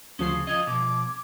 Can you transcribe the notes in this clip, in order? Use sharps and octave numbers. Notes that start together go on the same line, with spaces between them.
D2 C#3 F3 C#4 D#6 C7
F3 F4 D#5 D#6 G#6
B2 F3 D6